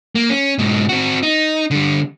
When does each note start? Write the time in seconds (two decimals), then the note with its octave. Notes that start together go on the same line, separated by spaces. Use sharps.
0.15 A#3
0.30 C#4
0.58 G#2 B2
0.89 C4 F#4
1.23 D#4
1.71 D3 G3